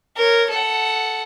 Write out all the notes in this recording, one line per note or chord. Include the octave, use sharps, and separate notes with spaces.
A#4 C#5
A4 F#5